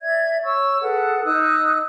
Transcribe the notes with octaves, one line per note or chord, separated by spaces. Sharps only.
D5 E5 G#6
C#5 C#6 E6
G#4 A4 B4 F#5
D#4 D#6 E6 F#6